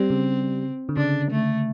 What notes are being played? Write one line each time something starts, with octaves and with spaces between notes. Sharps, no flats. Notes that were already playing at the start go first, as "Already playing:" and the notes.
Already playing: G3 C4
C#3
D3
C#3 D4
A3